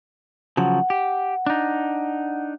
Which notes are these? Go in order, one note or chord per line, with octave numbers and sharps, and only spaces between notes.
C#3 F3 F#3 F#5
G4
D4 D#4